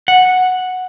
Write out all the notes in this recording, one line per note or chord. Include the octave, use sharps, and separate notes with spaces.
F#5